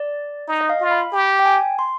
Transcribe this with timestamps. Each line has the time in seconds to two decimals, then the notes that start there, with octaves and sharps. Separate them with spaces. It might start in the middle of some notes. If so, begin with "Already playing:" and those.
Already playing: D5
0.48 D#4
0.61 D#5
0.69 F5
0.81 F4
0.91 B5
1.12 G4
1.39 G5
1.46 G#5
1.79 C6